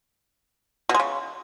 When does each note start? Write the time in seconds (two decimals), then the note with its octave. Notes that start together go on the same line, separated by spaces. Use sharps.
0.89 B2
0.94 G#3
1.00 C#3